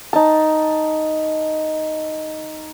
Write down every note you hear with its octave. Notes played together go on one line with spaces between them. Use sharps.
D#4 A5